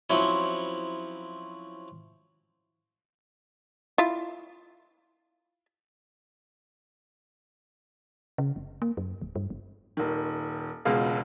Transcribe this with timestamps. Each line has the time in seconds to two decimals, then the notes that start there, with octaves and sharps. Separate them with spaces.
0.10 F3 F#3 C4 C#4 E4
3.98 E4 F4
8.38 C#3
8.56 F#1
8.82 A#3
8.97 F#2
9.22 D1
9.36 G2
9.50 F#1
9.97 D#1 D#3
10.85 E1 C#2 B2 G#3 F4 F5